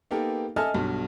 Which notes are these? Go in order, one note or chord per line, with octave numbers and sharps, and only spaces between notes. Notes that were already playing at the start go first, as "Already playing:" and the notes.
A#3 B3 D#4 G4 A4 A#4
A4 D#5 E5 G#5 A5 F6
B1 G2 B2